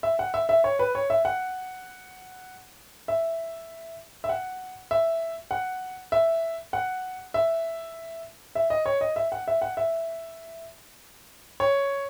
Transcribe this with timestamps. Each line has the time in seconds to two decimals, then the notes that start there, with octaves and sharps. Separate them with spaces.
0.03 E5
0.19 F#5
0.34 E5
0.49 E5
0.64 C#5
0.79 B4
0.95 C#5
1.10 E5
1.25 F#5
3.08 E5
4.24 E5
4.29 F#5
4.91 E5
5.51 F#5
6.12 E5
6.73 F#5
7.34 E5
8.55 E5
8.70 D#5
8.86 C#5
9.01 D#5
9.16 E5
9.32 F#5
9.48 E5
9.62 F#5
9.77 E5
11.60 C#5